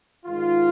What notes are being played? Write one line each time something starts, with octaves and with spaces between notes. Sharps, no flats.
G#2 D#3 F4